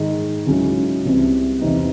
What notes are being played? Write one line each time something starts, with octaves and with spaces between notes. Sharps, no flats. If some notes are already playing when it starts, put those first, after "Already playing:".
Already playing: G#2 D#3 G#3 D#4
C#2 C#3 F#3 C#4 E4
C2 C3 E3
E2 C3 E3 C4 D#4